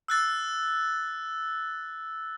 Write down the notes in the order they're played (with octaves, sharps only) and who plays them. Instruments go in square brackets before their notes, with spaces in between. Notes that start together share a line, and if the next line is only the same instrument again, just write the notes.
[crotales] E6 F#6 A6